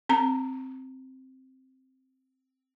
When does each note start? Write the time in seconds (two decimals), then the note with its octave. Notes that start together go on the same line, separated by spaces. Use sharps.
0.09 C4 A#5